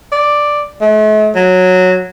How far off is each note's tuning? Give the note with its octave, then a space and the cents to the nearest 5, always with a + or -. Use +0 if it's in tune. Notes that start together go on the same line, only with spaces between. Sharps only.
D5 +5
A3 -45
F#3 -10